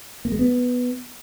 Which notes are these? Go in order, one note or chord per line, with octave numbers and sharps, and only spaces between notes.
A#3
G#3
B3